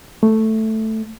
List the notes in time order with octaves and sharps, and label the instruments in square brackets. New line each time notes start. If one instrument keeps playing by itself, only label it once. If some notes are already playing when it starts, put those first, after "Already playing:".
[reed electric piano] A3